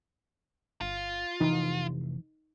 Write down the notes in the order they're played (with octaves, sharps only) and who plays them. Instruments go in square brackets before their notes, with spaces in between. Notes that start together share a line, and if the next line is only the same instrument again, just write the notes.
[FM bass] G1 [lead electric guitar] F4
[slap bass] F1 [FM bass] E3 [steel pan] D#4